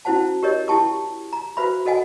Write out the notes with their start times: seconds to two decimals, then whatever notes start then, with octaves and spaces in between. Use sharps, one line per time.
0.05 C#4 E4 F#4 C5 F#5 A5
0.43 G4 A#4 C#5 D#5
0.68 E4 G4 G5 A5 C#6 D#6
1.33 A#5
1.57 F#4 B4 C5 E5 B5
1.86 F#4 A4 D#5 F#5 G#5